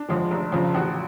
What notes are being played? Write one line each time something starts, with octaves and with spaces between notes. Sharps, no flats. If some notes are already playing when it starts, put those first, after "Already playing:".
Already playing: D4
F2 D3 F3 G#3
F1
F2 C#3 F3
A1 F#4